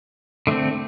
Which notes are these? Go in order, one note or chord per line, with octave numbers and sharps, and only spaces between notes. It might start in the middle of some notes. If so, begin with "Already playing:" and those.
D3 A3 C4